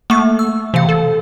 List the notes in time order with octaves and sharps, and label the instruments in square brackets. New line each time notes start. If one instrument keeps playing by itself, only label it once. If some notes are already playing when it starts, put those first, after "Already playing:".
[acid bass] A3 [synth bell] A#3 C#6
[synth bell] E6
[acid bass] C3 [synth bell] E3 F5
[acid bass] A4